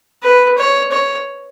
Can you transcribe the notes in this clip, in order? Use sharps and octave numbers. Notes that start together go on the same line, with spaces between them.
B4
C#5
C#5